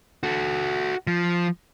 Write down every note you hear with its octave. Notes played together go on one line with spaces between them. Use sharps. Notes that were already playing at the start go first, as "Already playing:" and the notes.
F#4 A4
F3